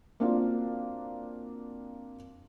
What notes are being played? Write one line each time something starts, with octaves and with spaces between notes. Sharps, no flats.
A#3 C4 D4 F4 F#4 F5